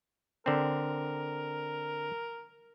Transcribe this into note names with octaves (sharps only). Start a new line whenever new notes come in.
D3 C4 A#4